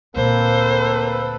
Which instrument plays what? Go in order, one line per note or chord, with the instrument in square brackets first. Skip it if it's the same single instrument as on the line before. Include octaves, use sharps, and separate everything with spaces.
[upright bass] D2 A#2 [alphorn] A#3 [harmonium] C4 A4 B4 [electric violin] C5